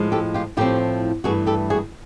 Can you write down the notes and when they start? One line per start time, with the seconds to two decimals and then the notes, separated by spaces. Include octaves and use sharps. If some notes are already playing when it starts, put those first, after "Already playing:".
Already playing: A2 F3 G#3
0.12 G4 A4
0.34 F4 G4
0.57 A2 F3 A3 C4 F4 G4
1.24 G2 E3 A3 F#4 G#4
1.47 G4 A4
1.70 F#4 G#4